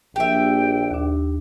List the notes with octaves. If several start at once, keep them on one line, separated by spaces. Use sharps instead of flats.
A#1 G4 E5 G5
D#2 D4